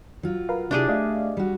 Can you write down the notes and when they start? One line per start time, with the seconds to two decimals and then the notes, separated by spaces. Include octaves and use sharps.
0.23 F#3 F4
0.49 A#4 B4 F5
0.71 C3 D4 E4 G4 G#4 D5
0.88 A3 D5 D#5 F5
1.37 G3 F#4